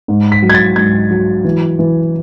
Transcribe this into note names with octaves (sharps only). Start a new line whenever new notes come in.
G#2
B6
F#3
G#6
A6
G#2 G#6
F#3
E3
E3